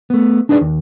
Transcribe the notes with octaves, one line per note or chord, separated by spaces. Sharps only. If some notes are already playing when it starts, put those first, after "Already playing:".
A3 B3
D4 D#4 G#4 B4 C#5 D5
D#2